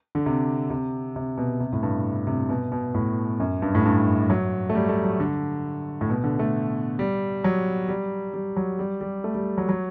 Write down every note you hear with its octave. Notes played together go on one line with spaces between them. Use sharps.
D3
C3
C3
C3
B2
C3
A2
G2
C3
B2
B2
A2
F#2
G2
A2
G2
F#3
A3
G3
A3
F#3
D3
A2
B2
D3
A3
G3
F#3
G3
G3
F#3
G3
G3
A3
G3
F#3
F#3